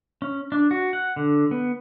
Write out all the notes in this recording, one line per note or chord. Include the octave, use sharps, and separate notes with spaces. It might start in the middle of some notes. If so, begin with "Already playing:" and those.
C#4
D4
F#4
F#5
D3
B3